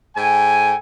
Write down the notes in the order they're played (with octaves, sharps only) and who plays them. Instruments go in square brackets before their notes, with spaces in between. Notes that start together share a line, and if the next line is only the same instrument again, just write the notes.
[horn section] G#2 A4 G5 G#5